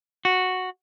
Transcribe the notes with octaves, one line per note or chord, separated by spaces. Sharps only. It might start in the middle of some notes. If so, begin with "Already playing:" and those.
F#4